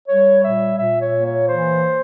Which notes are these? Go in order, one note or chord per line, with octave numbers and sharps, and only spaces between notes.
G3 C#5
A#2 E5
A#2 E5
C#5
A#3
C#5
E3 C5